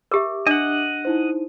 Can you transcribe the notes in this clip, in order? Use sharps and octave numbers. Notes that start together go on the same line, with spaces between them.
G4 A#4 E5 D6
D4 D#5 F#5
D#4 E4 C5